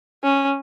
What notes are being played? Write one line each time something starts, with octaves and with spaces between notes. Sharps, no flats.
C#4